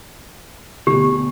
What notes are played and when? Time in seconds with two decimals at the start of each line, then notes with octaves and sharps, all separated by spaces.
0.87 D2 B2 G4